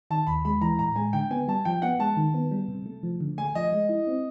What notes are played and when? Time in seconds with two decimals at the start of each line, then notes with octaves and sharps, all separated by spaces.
0.11 D#3 A5
0.27 D#2 B5
0.45 G#3 B5
0.61 E3 A#5
0.79 A2 A#5
0.96 G#3 G#5
1.13 D3 G5
1.31 B3 G#5
1.48 G3 A5
1.65 F3 G5
1.82 B3 F#5
1.99 G#3 A5
2.17 D#3
2.34 B3
2.51 G3
2.68 C3
2.86 A3
3.03 F3
3.21 D3
3.38 A3 G#5
3.55 F3 D#5
3.72 G#3
3.89 E4
4.07 C4